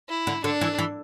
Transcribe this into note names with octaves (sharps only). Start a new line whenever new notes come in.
E4
D3
D3 D4
E3
E3